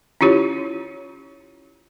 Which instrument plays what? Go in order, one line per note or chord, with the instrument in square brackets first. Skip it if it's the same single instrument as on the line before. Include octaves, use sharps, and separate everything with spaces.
[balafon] C#4 E4 F4 G4 C#5